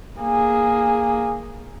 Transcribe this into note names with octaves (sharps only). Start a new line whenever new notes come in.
A#3 G#4